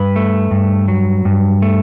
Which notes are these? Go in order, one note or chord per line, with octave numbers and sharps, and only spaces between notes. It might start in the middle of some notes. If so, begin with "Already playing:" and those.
Already playing: G2 B4
A3
G2
F#3
G2
A3